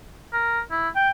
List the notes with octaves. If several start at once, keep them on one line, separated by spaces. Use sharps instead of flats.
A#4
E4
G5